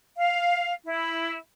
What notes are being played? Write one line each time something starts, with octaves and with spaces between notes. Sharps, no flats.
F5
E4